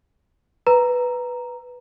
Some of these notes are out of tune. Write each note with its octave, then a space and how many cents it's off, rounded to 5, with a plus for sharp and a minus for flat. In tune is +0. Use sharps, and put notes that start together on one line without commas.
B4 +0 A#5 +0